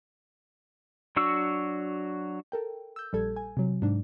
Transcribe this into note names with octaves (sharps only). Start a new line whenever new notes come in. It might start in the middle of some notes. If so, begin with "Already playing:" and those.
F#3 D4 F#4 C#6 E6
A4 A#4 G5
E6 G6
A#1 G3 A4 G#6
G#5
C3 F#3
G#2 D4